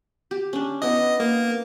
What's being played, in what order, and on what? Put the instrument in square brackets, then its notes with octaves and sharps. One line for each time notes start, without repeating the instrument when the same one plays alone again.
[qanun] G4
C#4 D4
[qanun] B3 E4 [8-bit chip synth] D#5
[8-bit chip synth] A#3